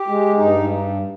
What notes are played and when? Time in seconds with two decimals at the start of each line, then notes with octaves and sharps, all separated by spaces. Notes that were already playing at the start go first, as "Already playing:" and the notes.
Already playing: G4
0.08 G#3
0.38 G2 D#4